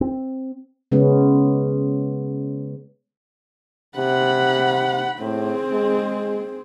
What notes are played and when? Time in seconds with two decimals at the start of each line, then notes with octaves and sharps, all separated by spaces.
0.01 C4
0.92 C#3 G#3 B3 C#4
3.97 C3 F#5 B5
5.20 A2 C4 G#4
5.73 G#3